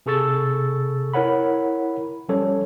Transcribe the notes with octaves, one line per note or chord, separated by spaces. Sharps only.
C3 G#4 A4 C#6 E6 A6
E4 A#4 C#5 F#5 B5
F3 G3 C#4 A4 C#5